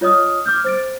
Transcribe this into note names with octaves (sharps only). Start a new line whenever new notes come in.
F4 C#5 D#5 D#6 F6
D6 F6 G6
C5 A6 D7